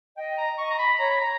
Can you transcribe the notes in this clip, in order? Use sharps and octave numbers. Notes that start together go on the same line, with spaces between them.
D#5 G5
A#5
D#5 C#6
A#5
B5
C#5 A#5
B5
A#5